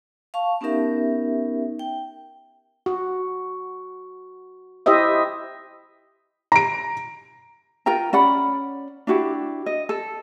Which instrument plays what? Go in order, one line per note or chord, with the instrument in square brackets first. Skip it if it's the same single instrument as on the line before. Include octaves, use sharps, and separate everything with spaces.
[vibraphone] F5 A5 C#6
B3 C#4 D#4 G4 A#4 E5
G5
[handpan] F#4
E4 G4 C5 D#5 E5
[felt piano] A#5 D7
[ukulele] F4 A#4 G5 A#5
C#4 D5 F#5 B5
D4 E4 F#4 G4
D#5
A4